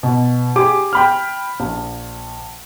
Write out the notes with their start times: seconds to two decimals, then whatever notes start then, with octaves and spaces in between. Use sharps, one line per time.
0.03 B2
0.56 G4 G#4 D6
0.93 G5 B5 F6
1.60 A#1